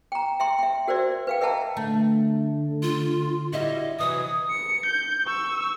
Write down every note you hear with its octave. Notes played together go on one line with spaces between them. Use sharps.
G5 A#5
E5 G5 C6
E5 G5
F#4 A#4 C5 D5 E5
B4 F5 G5
A#4 D#5 E5 F#5 A5 A#5
D3 A3
F4
G3 E4 F#4 D#5
C3 E3 F#3 D#6
C#7
G6
C#6 E6